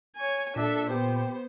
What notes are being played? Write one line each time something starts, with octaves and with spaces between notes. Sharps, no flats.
C#5 G#5
A#2 D4 A4 E5
B3 G4 C5